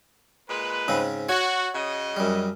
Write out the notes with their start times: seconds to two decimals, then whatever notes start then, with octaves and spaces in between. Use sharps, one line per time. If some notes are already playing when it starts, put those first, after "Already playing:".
0.49 A#2 G#3 B4
0.88 G#2 C#3 C4
1.29 F#4 C#5
1.74 C#3 F#4 D#5
2.17 F#2 G3